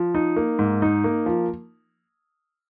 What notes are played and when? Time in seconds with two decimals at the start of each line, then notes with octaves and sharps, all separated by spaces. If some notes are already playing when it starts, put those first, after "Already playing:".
Already playing: F3
0.15 D#4
0.36 A#3
0.59 G#2
0.82 D#4
1.04 A#3
1.26 F3